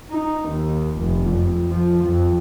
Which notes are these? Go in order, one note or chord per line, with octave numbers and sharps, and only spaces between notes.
D#4
D#2
F1
F2
F3
F2